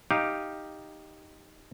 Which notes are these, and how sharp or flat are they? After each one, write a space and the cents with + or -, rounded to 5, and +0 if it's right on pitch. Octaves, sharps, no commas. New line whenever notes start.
D#4 +0 G4 +0 F5 +0